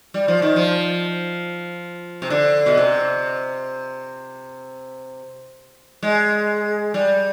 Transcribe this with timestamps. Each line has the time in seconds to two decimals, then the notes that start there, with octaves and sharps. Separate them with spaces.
0.14 G3
0.28 F3
0.42 D#3
0.56 F3
2.22 C3
2.30 D3
2.66 B2
2.77 C3
6.03 G#3
6.94 G3